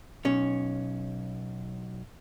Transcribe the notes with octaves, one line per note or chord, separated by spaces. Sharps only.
B1 C#4